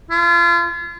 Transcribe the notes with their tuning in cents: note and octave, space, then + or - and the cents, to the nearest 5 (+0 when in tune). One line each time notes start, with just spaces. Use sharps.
F4 -35